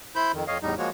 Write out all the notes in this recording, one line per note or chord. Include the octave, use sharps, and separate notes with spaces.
E4 C5 B5 G6
F2 D#3
F2 C#5 D#5 F5
E2 A2 G3 D#4
F3 G#3 A#3 F#4 C#5